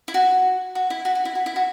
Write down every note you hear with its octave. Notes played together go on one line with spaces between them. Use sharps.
E4
F#4
F#4
E4
F#4
F#4
E4
F#4
E4
F#4